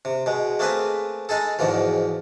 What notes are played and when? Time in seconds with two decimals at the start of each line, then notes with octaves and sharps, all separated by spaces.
0.05 C3
0.26 B2 G#3
0.59 A3 A#3 C4 G#4 B4
1.29 G#3 D#4 G#4 A4
1.59 E2 G#2 B2 E3 F3